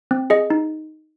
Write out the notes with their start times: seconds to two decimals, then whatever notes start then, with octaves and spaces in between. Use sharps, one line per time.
0.11 C4
0.30 G#4 D#5
0.50 D#4